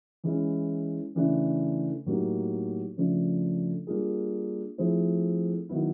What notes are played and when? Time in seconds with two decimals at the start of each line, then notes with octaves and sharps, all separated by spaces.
0.24 E3 G#3 C#4 E4
1.15 C#3 E3 A3 D4
2.06 A2 F#3 A#3 D#4 G4
2.97 C#3 F3 A3 D4
3.87 G3 A#3 D4 F4 G#4
4.78 F3 A3 C4 E4 G#4
5.69 D#3 F#3 B3 E4